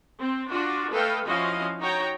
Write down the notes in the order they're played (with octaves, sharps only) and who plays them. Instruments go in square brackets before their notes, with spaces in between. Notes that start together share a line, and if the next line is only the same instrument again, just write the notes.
[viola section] C4
D4 F4 F#4
A3 A4 B4 D#5 F5 G5
F3 C#4 E4 F#4 D#5 F5
D#4 F#4 C#5 G5 A#5